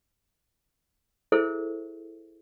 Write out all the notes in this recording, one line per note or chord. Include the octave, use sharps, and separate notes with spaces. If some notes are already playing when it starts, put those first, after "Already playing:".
E4 G#4 A4 C5 E5